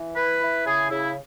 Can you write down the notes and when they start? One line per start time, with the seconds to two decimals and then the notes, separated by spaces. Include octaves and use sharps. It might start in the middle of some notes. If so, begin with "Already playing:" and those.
Already playing: E3
0.17 E4 B4
0.42 E4
0.66 C#3 G#4
0.90 C#3 E4